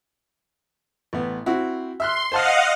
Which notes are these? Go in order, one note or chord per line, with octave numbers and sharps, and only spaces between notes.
A1 B3
C4 E4 F#4
E5 C6 F6 F#6
C5 D#5 F5 F#5 A5 F6